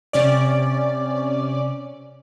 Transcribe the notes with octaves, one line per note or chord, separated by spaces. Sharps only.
C3 C#4 D5